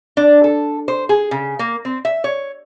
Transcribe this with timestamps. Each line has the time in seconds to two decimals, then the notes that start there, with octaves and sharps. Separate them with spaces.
0.17 D4
0.44 A4
0.88 C5
1.09 G#4
1.31 C#3
1.59 A#3
1.85 C4
2.05 E5
2.24 C#5